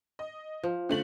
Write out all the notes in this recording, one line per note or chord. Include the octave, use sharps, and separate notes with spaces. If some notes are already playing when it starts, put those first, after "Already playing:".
D#5
F3
D3 A3 F#7